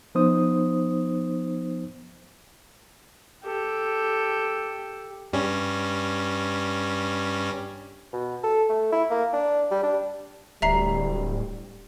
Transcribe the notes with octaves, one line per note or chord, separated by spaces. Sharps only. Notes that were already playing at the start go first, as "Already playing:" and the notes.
F3 B3 D#4 C5 D#6
G4 A4
G2 G3 C#4
B2
A4
A3
E4
A#3
D4
G3
D4
D1 G3 E5 A#5 C7